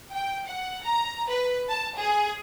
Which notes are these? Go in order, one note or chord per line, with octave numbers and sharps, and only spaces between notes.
G5
F#5
A#5
B4
A5
G#4